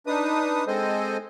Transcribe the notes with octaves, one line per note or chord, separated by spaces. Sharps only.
D4 D#4 B4 D#6
G#3 C4 A4 C5 D#5 G#5